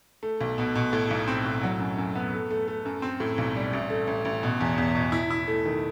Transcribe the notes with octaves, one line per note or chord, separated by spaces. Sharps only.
A3
B1
B2
B2
A2
B1
C4
A2
F#3
F#2
F#2
B3
A3
A3
A3
F#2
C4
A2
B1
G3
A1
A3
A1
A1
B2
E2
E2
B2
E4
E4
A3
D#3